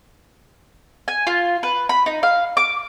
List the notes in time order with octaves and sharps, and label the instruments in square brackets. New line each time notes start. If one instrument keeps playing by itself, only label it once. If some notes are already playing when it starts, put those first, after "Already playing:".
[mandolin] G#5
F4
B4
B5
D#4
F5
D6